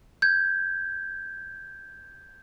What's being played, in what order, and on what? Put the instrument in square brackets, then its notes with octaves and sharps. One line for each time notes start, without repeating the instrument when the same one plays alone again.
[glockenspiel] G6 G#6